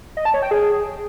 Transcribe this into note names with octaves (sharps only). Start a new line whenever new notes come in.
D#5
A5
C#5
G5
G#4